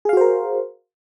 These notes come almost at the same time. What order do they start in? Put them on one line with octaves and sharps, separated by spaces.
G#4 F5 F#4 C5 A#4